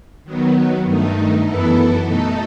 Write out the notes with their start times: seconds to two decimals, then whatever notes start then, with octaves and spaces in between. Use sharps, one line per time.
0.24 D#3 F#3 B3
0.84 G2 D#3 A3 D#4
1.45 F#2 E3 B3 E4 A4
2.06 B2 A3 D#4 A4